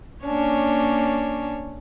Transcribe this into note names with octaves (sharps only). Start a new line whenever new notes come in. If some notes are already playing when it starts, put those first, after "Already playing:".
A#3 C#4 D4 C#5